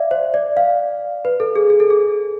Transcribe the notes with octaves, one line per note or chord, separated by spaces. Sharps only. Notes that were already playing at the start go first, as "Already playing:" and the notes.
Already playing: D5 E5 F5
C5
D5
F5
B4
A4
G#4
G#4
A4
G#4